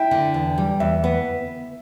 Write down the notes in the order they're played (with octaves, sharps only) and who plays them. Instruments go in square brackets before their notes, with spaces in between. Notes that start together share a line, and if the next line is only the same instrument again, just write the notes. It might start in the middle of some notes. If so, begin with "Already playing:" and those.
Already playing: [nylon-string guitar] E4 [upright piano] G5
[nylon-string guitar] D3
E2
G3
[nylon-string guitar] E2 [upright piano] E5
[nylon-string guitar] B3